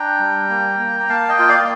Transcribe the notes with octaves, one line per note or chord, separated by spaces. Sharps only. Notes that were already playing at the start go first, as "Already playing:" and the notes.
Already playing: D4 G5 A#5
G3
A#3
A#3
A#5
A#3 F5 A5
D#5 G5
F4
D5 F5
D5